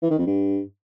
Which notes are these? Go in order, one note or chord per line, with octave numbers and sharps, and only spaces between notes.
E3
D#3
F2
G2